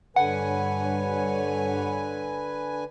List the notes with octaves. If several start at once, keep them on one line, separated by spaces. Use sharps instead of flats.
G2 D3 B4 C#5 F#5 G#5